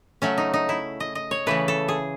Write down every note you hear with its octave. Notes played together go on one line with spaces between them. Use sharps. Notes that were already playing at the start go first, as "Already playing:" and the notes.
C#3 F#3 A3 C#4
D#4
D#4
E4
D#5
D#5
C#5
C#3 E3 A3 B4
A4
G#4